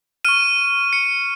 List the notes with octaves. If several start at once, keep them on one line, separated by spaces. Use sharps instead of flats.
C#6 F6 D#7
C#7